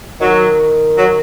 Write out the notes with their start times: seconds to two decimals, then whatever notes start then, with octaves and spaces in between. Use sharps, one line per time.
0.21 D#3 F#3
0.98 F#3